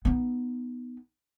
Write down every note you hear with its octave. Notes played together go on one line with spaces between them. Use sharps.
B3 D#4